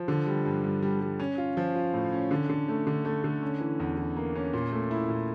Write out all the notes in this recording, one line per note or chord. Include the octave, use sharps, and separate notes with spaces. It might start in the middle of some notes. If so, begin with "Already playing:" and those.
Already playing: F3
D3
G3
G2
G2
G3
G3
C#4
F4
F3
F4
A2
C#4
D3
D3
A3
D3
A3
D3
C#4
E3
E2
E3
A#3
C#4
A#2
A3
E4
A#2